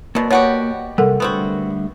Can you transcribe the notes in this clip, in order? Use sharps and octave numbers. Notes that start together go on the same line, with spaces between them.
B2 F#3 A#3 A#4 D5
B2 F#4 G4 C#5 F#5
C3 G3 A4 A#4 F#5
D3 G3 A3 B3 C4 F#4